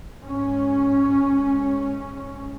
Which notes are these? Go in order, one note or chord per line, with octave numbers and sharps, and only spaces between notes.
G#2 C#4